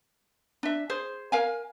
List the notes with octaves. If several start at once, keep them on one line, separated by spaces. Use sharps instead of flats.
D4 E5
G#4 C5
A#4 F5 G#5